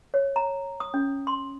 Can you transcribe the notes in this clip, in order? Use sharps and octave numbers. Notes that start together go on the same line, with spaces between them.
C#5
A#5
D#6
C#4
C6